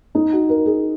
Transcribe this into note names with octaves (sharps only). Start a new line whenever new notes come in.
D#4
F#4
A#4
G#4